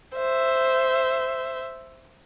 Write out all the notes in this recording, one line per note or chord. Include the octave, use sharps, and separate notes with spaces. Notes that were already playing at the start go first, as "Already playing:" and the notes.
C5 E5